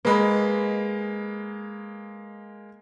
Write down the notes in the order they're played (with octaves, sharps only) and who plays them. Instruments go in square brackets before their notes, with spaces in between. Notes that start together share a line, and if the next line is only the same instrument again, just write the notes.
[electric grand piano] G#3 A#3 [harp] B4 D#5 B5